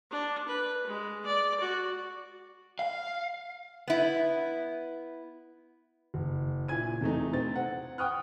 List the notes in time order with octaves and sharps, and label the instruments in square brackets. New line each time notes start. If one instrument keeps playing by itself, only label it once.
[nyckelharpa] D4
B4
G#3
D5
F#4
[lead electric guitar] F5
[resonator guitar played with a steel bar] B3 E4
[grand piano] F#1
A#2 E4 G#5 G#6 D#7
E2 C3 A3 D#4
C3 C4 A6
F#5
F#5 G5 C#6 D#6 F6 F#6